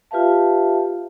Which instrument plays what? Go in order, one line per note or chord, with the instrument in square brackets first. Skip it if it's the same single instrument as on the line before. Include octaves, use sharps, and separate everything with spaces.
[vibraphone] F4 G4 B4 E5 F5 A5